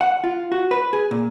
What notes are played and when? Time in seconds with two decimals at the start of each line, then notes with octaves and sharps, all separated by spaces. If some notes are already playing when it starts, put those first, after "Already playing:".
0.01 F#5
0.24 F4
0.52 F#4
0.71 B4
0.93 G#4
1.11 A#2